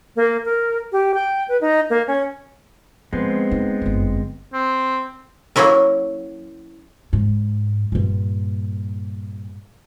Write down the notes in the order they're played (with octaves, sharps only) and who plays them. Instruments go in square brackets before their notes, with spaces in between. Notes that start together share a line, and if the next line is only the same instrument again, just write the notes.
[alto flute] A#3
A#4
G4
G5
B4
D#4
A#3
C#4
[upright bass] F3 [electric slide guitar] G#3 B3 C4
[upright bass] D#4
G1 F#2
[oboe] C4
[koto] F#3 A#3 C#4 E4 A#4
[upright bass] G#2
G2 A#2